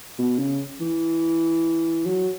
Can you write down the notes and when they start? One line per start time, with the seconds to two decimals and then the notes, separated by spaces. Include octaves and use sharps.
0.18 B2
0.38 C#3
0.80 E3
2.06 F#3